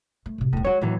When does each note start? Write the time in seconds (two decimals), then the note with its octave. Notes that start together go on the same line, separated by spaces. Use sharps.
0.26 A3
0.38 A2 C3
0.53 D#1 A2 B3
0.65 G#3 F#4 C#5
0.81 D#2 A2 E3 F#3